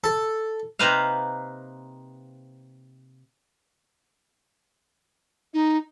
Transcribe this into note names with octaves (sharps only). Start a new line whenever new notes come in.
A4
C3 A#3 D#4 B4 C5 F5
D#4